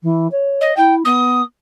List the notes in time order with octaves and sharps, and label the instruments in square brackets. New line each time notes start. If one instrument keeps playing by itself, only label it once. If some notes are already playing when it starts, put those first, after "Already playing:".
[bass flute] E3
C#5
[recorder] D#5
[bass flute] E4 [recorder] G5
[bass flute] B3 [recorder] D#6